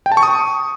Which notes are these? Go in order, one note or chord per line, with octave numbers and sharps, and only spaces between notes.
G5
A5
C#6
D#6